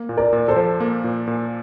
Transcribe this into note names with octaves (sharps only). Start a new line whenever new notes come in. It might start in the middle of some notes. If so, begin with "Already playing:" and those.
Already playing: A#3
A#2
A#4 D5
A#2
A4 C5
F3
A#3
A#2
A#2